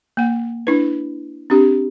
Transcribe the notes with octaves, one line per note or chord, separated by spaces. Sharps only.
A#3 F#5
D4 E4 B4
C4 D4 G4